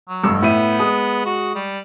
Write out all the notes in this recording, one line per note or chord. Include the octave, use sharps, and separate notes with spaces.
F#3
F1 G2 E6
A2 B3 E5 D#7
G#3 D#6
F#4
G3